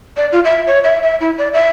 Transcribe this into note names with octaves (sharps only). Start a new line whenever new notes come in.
D5
F4
E5
C#5
E5
E5
E4
D5
E5